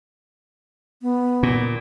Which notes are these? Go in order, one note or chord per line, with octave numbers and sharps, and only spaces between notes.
B3
A#2